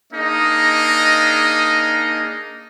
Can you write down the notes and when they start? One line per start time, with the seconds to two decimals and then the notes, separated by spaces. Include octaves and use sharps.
0.13 A#3 D4 D#4 G#4 D#5